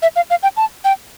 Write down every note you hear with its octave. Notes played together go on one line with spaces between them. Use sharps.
E5
F5
F5
G5
A5
G5